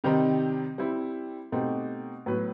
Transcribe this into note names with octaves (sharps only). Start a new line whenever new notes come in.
C3 D#3 G3 C4 D#4
G3 C4 E4
B2 A3 C4 D#4 G4
A2 F#3 B3 F#4 B4